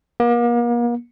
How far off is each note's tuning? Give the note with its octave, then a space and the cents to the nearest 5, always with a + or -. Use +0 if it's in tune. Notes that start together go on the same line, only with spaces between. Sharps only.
A#3 +40